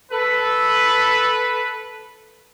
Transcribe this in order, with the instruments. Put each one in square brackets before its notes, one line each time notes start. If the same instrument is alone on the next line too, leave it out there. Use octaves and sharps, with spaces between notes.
[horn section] A4 B4